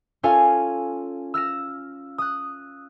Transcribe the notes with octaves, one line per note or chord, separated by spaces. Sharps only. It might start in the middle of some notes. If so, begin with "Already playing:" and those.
C#4 F4 A4 F5 G#5
E6 F6 A#6 E7
D#6 F#6